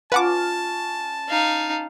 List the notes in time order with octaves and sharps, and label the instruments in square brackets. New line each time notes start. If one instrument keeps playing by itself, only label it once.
[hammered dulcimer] C#4 F4 [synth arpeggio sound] B4 F#5 D6 [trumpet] A5
[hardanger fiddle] D#4 F5